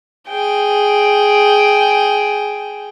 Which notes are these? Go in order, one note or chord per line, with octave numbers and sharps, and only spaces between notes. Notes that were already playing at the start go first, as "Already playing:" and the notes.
G#4 G5